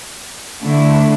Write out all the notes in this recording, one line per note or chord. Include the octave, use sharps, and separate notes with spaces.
D3 A3 E4